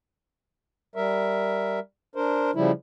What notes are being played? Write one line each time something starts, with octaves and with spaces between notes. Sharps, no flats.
G3 A#4 E5
D4 A#4 C5
C#3 F3 G3 E4